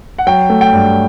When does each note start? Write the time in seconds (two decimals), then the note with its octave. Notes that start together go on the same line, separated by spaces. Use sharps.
0.18 F#5
0.27 F#3 G5
0.50 A3
0.61 G5
0.73 G2